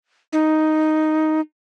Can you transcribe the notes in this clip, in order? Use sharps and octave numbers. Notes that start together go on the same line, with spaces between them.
D#4